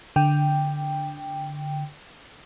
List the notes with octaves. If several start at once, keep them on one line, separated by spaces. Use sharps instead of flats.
D3 G5